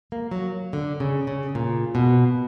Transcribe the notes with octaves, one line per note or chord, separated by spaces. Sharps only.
A#3
F#3
D3
C#3
C#3
A#2
B2